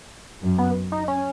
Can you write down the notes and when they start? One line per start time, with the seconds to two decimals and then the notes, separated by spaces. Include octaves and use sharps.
0.42 F#2
0.58 B3
0.92 D#4
1.08 C#4